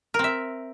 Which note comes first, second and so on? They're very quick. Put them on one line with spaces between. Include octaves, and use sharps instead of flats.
A#4 C4 E5